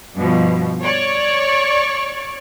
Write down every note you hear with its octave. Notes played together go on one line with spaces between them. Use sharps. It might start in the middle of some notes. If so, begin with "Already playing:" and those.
G2 B2 F3
C#5 D5 C#6